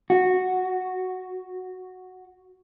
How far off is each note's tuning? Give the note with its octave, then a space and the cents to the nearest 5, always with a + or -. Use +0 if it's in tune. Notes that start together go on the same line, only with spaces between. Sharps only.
F#4 -5